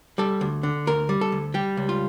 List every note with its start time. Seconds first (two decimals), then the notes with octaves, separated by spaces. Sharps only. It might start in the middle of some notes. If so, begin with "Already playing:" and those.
0.18 G3 A4
0.41 D2
0.63 D3
0.87 D2 A#4
1.09 G3
1.21 A4
1.32 D2
1.54 G3 G4
1.77 C#2
1.89 F4